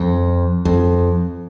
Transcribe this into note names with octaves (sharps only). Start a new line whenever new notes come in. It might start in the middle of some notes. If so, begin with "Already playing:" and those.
Already playing: F2
F2